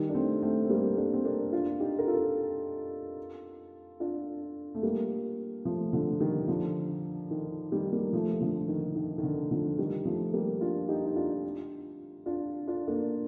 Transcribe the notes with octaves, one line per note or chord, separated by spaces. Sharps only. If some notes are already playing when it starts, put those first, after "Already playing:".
Already playing: D#3 G3
D4
A3 C4
A3 C4
C4
G3 A#3
A#3 D4
C4
A#3 D4
D4 F4
D#4 G4
A#4
F4 A4
D4 F4
A3
G3 A#3
F3 A3
D3 F3
D#3 G3
D3 F3
D#3
D#3 G3
G3 A#3
F3 A3
D3 F3
D#3
D#3
D#3
D3
D3 F3
D#3 G3
F3 A3
G3 A#3
D4 F4
D#4 G4
D#4
D4 F4
D4 F4
D4 F4
A#3 D4